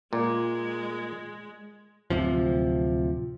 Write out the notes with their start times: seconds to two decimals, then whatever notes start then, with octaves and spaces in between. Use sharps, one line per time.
0.13 A#2 G#3
2.10 D1 A#1 C3 F3